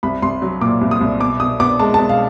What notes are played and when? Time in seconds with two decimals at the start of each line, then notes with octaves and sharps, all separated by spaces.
0.03 C2 B5
0.22 C2 C6
0.42 F#3
0.61 A#2 D6
0.81 C2
0.91 D#6
1.01 C2
1.20 B2 D6
1.40 B2 D#6
1.60 B3 D6
1.79 G#3 A5
1.94 B2 A5
2.09 F5